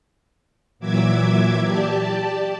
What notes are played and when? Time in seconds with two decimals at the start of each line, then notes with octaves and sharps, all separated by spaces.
0.79 A#2 E3 F#3 E5 D6 G#6
1.61 G4 D5 A5